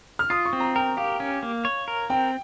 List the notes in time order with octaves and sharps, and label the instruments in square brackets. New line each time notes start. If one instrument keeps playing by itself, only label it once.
[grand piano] F6
[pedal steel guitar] F4 [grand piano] D#6
[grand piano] C#6
[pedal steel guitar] C4
[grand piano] A#5
[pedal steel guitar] A#4 [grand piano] G5
[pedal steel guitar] G4 [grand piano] F5
[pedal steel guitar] C#4
A#3
C#5
A#4
[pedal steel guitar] C4 [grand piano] G5